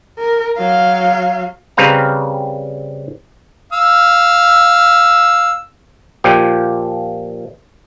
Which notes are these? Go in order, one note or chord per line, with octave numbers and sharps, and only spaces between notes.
A#4
F#3 F5
C#3 G3 C4 B4 F5 A#5
F5 E6
A#2 F3 G4